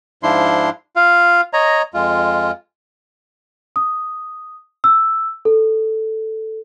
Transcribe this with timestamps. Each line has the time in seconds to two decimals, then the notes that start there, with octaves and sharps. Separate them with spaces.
0.23 G#2 F3 D4 E4 C6
0.96 F4 F5
1.53 C#5 D#5 A#5
1.94 F2 G#3 F4
3.76 D#6
4.84 E6
5.45 A4